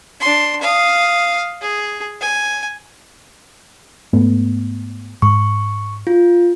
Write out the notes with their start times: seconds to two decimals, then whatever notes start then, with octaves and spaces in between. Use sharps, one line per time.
0.20 D4 C6
0.61 F5 D#6
1.61 G#4
2.21 G#5
4.13 G#2 A3 B3
5.22 G#2 C#6
6.07 F4